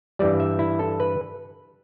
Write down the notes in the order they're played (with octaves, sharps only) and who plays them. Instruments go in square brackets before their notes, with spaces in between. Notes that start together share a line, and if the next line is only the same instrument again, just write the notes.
[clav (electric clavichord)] G2 E3 G3 D5
E5
E4
A4
B4